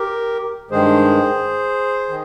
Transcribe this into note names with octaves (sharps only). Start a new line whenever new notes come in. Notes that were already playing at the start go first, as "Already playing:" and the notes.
Already playing: G4 A#4
G2 D#3 G#3 G#4 C5
D#3